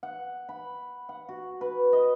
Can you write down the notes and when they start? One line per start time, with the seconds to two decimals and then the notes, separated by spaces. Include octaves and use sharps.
0.03 F#5
0.49 B5
1.09 F#5
1.29 F#4
1.61 B4
1.93 D#5